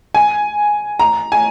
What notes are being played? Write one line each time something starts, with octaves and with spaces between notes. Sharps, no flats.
G#5
A#5
G#5